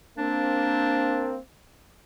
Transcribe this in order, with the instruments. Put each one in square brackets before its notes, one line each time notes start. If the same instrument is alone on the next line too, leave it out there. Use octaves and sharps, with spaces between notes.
[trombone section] A#3 C4 [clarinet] D4